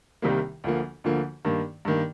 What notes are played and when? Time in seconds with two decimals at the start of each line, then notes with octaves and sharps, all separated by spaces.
0.22 C2 C3 D#3 G3 A#3
0.64 D2 D3 F3 A#3
1.04 D2 D3 F3 A#3
1.45 G2 D#3 A#3
1.85 G2 D#3 A#3